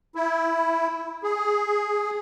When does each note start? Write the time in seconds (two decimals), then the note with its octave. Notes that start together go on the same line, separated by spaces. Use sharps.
0.15 E4
1.23 G#4